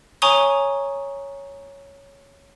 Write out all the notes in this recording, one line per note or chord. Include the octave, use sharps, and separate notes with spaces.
C#5 G#5 A#5 C#6 D#6 G7